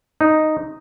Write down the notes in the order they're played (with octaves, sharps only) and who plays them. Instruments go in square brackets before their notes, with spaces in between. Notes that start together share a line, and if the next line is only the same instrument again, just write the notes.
[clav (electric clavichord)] D#4